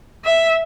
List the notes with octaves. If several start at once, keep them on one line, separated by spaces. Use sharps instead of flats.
E5